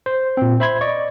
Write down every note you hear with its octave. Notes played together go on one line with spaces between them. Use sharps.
C5
A#2 C4
C5 E5 B5 C6 G#6
D5 D#5 C#6